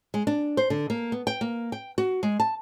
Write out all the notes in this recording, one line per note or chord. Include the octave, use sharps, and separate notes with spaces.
G#3
D4
C5
D3
A#3
B3
G5
A#3
G5
F#4
G#3
A5